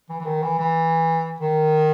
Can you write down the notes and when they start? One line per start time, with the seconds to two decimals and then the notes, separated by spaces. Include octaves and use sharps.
0.09 E3
0.20 E3
0.25 D#3
0.42 E3
0.59 E3
1.40 D#3